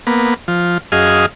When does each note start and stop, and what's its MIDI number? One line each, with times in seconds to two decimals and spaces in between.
0.07 0.34 58
0.07 0.34 59
0.48 0.78 53
0.92 1.26 42
0.92 1.26 68
0.92 1.26 75
0.92 1.26 77